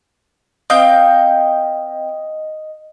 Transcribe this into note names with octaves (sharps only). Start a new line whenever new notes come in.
C4 D#5 F5 G5 G6